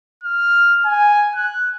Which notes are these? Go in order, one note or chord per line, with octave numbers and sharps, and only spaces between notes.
F6
G#5
F#6